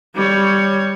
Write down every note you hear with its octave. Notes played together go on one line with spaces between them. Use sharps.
G3 C#5